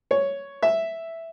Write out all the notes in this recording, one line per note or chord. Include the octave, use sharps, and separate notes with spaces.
C#5
E5